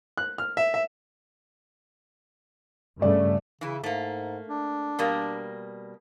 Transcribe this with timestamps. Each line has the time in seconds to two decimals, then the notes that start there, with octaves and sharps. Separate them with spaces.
0.17 F#6
0.38 F6
0.57 E5
0.74 E5
3.02 G2 C#3 A3 D5
3.61 C#3 E3 E4
3.84 G#2 A3 A#3
4.48 D4
4.99 B2 G3 A#3